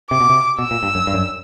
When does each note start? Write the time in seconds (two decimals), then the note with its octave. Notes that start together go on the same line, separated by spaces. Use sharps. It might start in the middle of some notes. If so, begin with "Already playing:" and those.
0.11 C3 D6
0.20 B2
0.30 C3
0.59 B2 E6
0.71 A#2
0.83 G2
0.95 F#2
1.07 G2
1.14 F#2